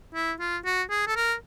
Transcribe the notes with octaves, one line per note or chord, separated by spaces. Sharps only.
E4
F4
F#4
G#4
A4
A#4